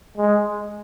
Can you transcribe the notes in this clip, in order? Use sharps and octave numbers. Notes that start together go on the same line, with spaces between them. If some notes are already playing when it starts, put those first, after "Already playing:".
G#3